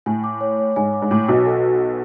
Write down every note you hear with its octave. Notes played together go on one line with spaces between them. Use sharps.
A2 G#5
D6
C#5
C#5
G#2 G#5
D6
G#2
A2 D6
B1 B2 F#4
A4